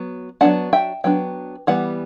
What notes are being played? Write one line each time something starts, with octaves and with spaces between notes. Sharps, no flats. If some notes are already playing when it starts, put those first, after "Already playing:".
Already playing: F#3 B3
F#3 B3 D4 F#5 A5
E5 G5
F#3 B3 D4 G5
E3 G3 B3 F#5